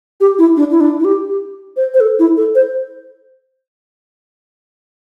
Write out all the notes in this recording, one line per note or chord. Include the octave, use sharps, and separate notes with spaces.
G4
E4
D4
E4
D4
E4
G4
G4
C5
C5
A4
E4
A4
C5